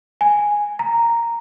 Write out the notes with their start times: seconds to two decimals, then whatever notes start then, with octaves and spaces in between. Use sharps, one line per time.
0.21 G#5
0.79 A#5